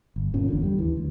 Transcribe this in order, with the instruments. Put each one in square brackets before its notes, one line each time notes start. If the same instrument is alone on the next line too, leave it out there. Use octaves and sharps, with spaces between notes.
[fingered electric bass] G1
G1 A#2 C#4
G1 E2 D3
G3
D#2 E3
D2